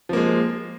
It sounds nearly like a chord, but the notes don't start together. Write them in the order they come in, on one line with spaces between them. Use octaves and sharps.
F3 A#3 G#3